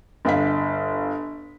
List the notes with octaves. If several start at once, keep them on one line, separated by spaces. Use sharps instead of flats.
G1 D#5 F5 B6